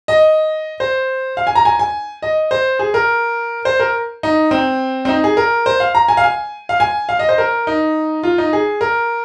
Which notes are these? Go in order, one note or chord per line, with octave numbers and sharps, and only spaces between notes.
D#5
C5
F5
G#5
A#5
G#5
G#5
D#5
C5
G#4
A#4
C5
A#4
D#4
C4
C4
D#4
G#4
A#4
C5
F5
A#5
G#5
F5
G#5
F5
G#5
F5
D#5
C5
A#4
D#4
F4
D#4
G#4
A#4